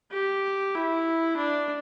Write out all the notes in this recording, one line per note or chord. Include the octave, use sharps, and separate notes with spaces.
G4
E4
D4